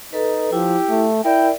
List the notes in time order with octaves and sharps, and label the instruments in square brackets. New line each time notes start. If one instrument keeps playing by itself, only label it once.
[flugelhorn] D#4 [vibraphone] A4 B4
[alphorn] F3 [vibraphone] E4 [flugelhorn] G4
[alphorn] A3
[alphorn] E4 [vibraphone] A#4 D5 E5 [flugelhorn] G5